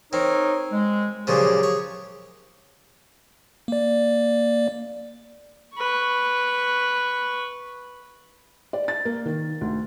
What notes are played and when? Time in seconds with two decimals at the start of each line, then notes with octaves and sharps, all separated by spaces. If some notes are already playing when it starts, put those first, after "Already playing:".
0.13 C4 D#4 A#4 C#5
0.72 G#3
1.27 A#2 C#3 F3 F#3 G4 G#4
1.63 C#5
3.68 A#3 D5
5.76 B4 C#6
8.73 D5
8.88 A6
9.05 A#3
9.26 D#3
9.61 D2